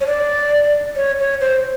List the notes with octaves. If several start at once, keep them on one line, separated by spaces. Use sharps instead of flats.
C#5
D5
C#5
C#5
C5